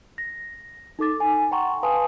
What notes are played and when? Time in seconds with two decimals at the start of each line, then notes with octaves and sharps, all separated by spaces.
0.18 A#6
0.99 D#4 A4 D6 A6
1.20 G#5
1.51 F#5 G5 A#5 C6 C#6
1.83 B4 F5 G#5 A5 C6 D#6